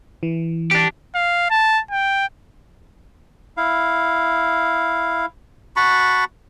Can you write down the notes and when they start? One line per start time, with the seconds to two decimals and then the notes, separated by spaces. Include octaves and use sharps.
0.23 E3
0.71 D4 G4
1.15 F5
1.51 A5
1.91 G5
3.57 E4 F5
5.76 F#4 A5 B5 C#6